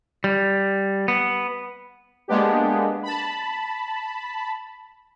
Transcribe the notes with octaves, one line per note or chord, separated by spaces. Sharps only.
G3
B3
G#3 A#3 B3 D4 G4
A5 B5